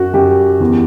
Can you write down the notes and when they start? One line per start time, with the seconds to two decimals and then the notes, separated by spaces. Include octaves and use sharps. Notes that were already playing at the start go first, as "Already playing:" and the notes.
Already playing: F#2 F#4
0.14 F#2 G4
0.60 E2